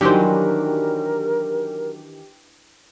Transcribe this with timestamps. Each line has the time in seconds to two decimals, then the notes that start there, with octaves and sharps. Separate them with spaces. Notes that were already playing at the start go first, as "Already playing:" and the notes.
0.01 D#3 E3 F#3 D4 G4 A#4 C5